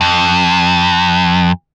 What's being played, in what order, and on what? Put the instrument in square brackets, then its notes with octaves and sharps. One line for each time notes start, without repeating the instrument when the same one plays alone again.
[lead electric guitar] F2